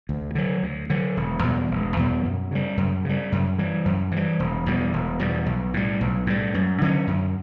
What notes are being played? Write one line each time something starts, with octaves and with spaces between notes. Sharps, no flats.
D2
D3 F#3
D2
D3 F#3
E1
E2 B2 G3
E1
E2 B2 G3
F#2
C#3 G3
F#2
C#3 G3
F#2
E3 G3
F#2
E3 G3
E1
E2 B2 G3
E1
E2 B2 G3
B1
A2 G3
B1
A2 G3
F#2
D3 F#3 C#4
F#2